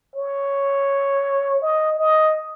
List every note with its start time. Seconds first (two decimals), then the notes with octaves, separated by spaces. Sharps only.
0.16 C#5
1.62 D#5
1.99 D#5